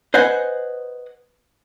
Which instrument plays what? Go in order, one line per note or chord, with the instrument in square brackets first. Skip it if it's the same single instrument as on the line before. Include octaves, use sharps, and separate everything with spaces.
[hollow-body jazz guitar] B4 C5 D#5 F#5 G#5